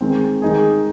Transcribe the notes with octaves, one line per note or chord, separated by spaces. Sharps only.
D#3 G#3 C4
D#3 G#3 D#4 G#4